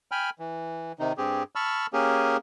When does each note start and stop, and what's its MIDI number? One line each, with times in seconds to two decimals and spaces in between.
0.12 0.30 79
0.12 0.30 80
0.12 0.30 83
0.12 0.30 89
0.39 0.92 52
0.99 1.13 48
0.99 1.13 51
0.99 1.13 63
1.18 1.43 43
1.18 1.43 60
1.18 1.43 67
1.18 1.43 68
1.55 1.87 81
1.55 1.87 83
1.55 1.87 85
1.55 1.87 88
1.55 1.87 89
1.93 2.37 58
1.93 2.37 61
1.93 2.37 67
1.93 2.37 68
1.93 2.37 70